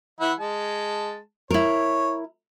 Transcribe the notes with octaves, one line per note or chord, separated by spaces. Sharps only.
E3 E4 F#5
G#3 A5
E4 A#4 C#5